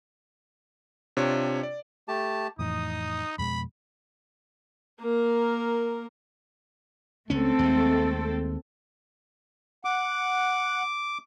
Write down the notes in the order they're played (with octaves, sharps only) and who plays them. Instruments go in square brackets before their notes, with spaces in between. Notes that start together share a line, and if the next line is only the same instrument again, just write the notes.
[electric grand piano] C3 D4 F4 C#5
D5
[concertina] A3 G4 A5
[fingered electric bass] F2 A2 E3 [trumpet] D#4 [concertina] D#6
[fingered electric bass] F2 B2 G#3 [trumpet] B5
[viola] A#3 A#4
[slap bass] C#2 C#4 [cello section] A3 C4 A4
[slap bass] D#2 G#3
[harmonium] F#5 [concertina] D6